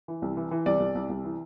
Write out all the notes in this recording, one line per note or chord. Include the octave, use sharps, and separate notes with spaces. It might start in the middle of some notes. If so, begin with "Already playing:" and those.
E3
C2
E3
E3
C2 D5
C2
C2
C2
E3